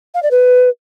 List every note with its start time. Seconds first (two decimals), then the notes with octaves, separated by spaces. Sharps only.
0.14 F5
0.23 D5
0.31 B4